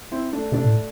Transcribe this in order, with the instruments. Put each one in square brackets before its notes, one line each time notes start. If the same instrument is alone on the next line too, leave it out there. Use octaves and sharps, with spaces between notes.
[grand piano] C4 E4
A3 D4
[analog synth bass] C3 [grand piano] A3 D4
[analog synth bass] A2